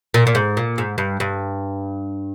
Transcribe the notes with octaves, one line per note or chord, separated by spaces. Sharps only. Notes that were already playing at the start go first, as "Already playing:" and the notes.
A#2
A#2
G#2
A#2
G#2
G2
G2